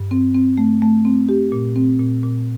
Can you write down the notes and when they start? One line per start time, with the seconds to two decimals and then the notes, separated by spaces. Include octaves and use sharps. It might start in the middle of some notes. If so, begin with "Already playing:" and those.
Already playing: G2
0.11 C4
0.34 C4
0.58 A3
0.82 A3
1.05 C4
1.29 G4
1.52 A#2
1.76 C4
2.00 A#2
2.23 A#2